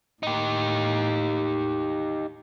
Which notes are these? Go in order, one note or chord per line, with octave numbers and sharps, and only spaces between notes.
A2 D#4 G4